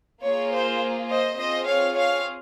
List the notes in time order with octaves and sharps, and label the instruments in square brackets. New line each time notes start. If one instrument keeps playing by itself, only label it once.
[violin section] A#3 F4 G#4 C#5
C5
C5 D#5
C4 F4 G#4 C5 D#5
C#5 F5
C#5 F5